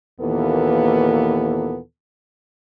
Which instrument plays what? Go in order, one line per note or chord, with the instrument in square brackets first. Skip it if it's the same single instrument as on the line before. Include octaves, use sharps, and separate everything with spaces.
[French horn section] D#2 A#2 E3 A#3 B3 A4